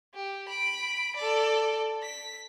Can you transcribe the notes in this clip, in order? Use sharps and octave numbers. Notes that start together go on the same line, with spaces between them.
G4
B5 D7
A4 D5
B6